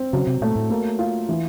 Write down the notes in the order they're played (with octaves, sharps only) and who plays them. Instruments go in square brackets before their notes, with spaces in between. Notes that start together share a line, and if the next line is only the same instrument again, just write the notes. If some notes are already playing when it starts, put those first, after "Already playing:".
Already playing: [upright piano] C4
[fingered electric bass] C#3 [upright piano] F#3
[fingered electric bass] C3
[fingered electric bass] A#2 [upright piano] A3
[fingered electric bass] A2
[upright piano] A#3
F4
E3